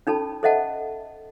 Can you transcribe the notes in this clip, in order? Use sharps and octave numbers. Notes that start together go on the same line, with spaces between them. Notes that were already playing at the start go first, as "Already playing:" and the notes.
C#4 D#4 A4 A5 B5
A4 C5 D#5 E5 F#5 A5